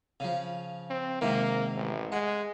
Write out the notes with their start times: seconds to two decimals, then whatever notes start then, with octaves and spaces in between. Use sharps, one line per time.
0.20 C#3 F3
0.90 C4
1.21 G#2 C3 D#3 A#3
1.75 A1
2.12 G#3 F#5